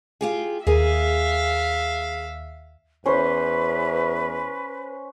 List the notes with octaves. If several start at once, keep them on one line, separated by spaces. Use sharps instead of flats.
F4 G4 G#4
D#2 G#4 A#4 E5 F5 G#5
E2 C#4 B4 C5